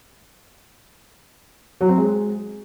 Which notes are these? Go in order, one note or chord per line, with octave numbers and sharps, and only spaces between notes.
F#3
C4
G#3